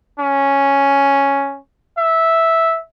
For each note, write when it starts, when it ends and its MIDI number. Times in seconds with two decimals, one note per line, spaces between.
0.19 1.58 61
1.98 2.80 76